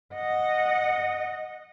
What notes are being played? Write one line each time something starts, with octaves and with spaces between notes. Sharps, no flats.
D#5 F#5